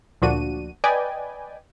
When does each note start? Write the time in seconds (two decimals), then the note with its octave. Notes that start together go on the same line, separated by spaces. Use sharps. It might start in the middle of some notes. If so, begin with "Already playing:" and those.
0.22 D2 A#2 F3 D4 F#4 D#7
0.84 B4 D5 D#5 G5 G#5